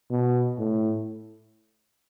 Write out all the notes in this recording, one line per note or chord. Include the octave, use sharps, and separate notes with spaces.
B2
A2